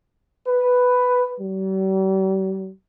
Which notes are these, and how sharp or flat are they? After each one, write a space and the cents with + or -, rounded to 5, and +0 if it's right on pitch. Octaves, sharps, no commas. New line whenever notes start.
B4 +5
G3 -45